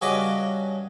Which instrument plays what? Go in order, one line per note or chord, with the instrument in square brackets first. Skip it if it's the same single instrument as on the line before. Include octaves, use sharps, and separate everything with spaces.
[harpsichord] G2 C#3 F#4 B4 D#5 D6